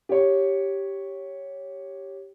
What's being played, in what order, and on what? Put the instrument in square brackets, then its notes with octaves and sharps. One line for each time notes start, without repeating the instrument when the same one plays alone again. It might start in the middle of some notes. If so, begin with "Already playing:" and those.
[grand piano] G4 C#5